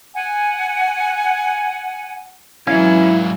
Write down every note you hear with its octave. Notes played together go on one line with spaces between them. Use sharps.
F#5 G#5
G#2 E3 F#3 C#4 E4 F5